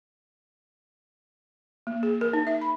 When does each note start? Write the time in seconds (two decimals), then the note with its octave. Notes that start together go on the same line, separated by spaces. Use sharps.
1.87 A#3
2.03 G#4
2.21 A#4
2.33 D#4
2.47 E5
2.61 B5